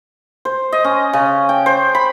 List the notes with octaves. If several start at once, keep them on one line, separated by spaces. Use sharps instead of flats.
C5
D#5
C#4
C#3
G5
C5
B5